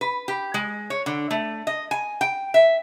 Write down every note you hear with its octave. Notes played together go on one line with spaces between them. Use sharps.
B4
G4
G#3
C#5
D3
A3
D#5
G#5
G5
E5